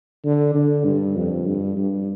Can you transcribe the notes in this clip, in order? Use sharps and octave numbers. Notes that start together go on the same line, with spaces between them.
D3
D3
G2
F2
G2
G2